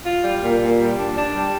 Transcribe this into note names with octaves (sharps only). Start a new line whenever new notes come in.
F4
G3
A#2
A#2
G3
D4
D4
G3